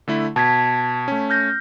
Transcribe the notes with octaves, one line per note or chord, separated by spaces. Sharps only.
D3 A3 E4
B2 A5 G#6 B6
A3 C#4
F6 G6 A#6